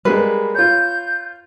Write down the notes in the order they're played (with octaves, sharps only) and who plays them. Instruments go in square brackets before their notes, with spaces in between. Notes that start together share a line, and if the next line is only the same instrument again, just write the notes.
[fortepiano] G3 G#3 A#3 [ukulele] B4
[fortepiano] F4 C#5 [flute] G6